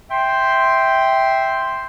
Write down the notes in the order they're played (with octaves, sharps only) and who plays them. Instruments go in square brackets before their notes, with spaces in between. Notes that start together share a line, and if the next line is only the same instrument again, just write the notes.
[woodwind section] E5 G5 C6